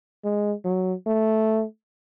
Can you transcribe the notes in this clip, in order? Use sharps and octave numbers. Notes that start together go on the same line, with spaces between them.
G#3
F#3
A3